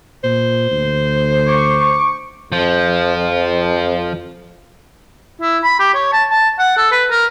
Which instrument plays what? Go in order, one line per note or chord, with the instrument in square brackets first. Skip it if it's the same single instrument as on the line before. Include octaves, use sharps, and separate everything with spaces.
[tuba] A#2 [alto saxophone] C5
[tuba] D2
[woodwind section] C#6 D6
[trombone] F2 [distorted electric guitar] F3
[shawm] E4
B5
G4
C#5
A5
A5
F#5
A4
B4
A#4